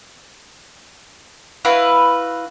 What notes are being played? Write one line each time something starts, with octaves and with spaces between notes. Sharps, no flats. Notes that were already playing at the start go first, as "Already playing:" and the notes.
E4 F#4 B4 F5